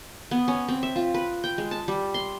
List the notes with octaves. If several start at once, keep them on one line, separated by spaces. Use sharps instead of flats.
B3
C#4
C4
E5
F4
B4
G5
G#3
A5
G3
C6